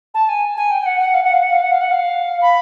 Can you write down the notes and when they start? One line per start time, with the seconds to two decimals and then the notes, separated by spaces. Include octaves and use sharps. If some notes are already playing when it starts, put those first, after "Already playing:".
0.14 A5
0.29 G#5
0.57 G#5
0.71 G5
0.82 G5
0.86 F#5
1.00 F#5
1.14 F5
1.23 F#5
1.33 F5
1.43 F#5
1.52 F5
1.61 F#5
1.71 F5
1.81 F#5
1.91 F5
2.42 B5